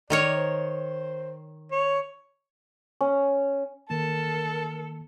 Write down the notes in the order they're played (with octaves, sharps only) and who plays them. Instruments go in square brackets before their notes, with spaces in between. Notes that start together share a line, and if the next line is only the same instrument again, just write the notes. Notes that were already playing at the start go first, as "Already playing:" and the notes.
[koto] D#3 A#4 C#5 [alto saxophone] D5
[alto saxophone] C5
C#5
[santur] C#4
[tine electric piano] D#3 A#3 [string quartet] A4 [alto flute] A#4 [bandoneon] A5